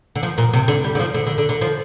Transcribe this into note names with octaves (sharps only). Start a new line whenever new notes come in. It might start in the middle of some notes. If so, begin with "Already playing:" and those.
D3
F3
A#2
C3
D3
G3
D3
F3
D3
D3
D3
D3
F3